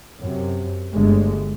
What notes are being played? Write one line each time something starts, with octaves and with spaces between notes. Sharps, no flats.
F#2 C3
G1 D3 G#3 A3